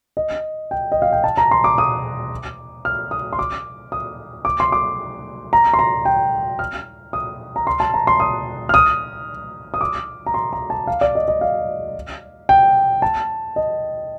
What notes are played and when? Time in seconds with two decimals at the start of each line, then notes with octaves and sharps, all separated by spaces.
0.17 D#5
0.71 G5
0.92 D#5
1.02 F5
1.12 G5
1.24 A5
1.37 A#5
1.51 C6
1.64 D6
1.78 D#6
2.85 F6
3.11 D#6
3.33 C6
3.39 D6
3.92 D#6
4.45 D6
4.60 C6
4.72 D6
5.53 A#5
5.73 C6
5.79 A#5
6.05 G5
6.59 F6
7.13 D#6
7.56 A#5
7.67 C6
7.80 A5
7.94 A#5
8.07 C6
8.20 D#6
8.69 F6
8.74 D#6
9.74 D#6
9.81 D6
10.26 A#5
10.34 C6
10.53 A#5
10.70 A5
10.87 F5
11.01 D5
11.15 D#5
11.28 D#5
11.41 F5
12.49 G5
13.02 A5
13.56 D#5